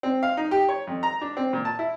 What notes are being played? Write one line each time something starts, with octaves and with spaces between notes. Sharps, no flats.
C4
F5
D#4
G4
C#5
F2
A#5
D4
C4
A#2
A5
E4